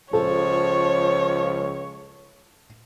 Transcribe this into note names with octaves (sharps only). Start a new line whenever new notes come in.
C#2 F3 A4 C#5